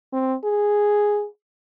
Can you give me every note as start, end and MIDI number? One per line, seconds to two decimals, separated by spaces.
0.13 0.35 60
0.44 1.26 68